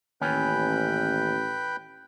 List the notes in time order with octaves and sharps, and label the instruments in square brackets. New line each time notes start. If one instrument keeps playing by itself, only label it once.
[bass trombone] A1 [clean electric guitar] D#2 C#4 [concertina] B4 G5 B5